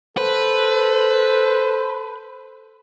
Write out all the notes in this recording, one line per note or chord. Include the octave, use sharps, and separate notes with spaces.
A4 B4 C5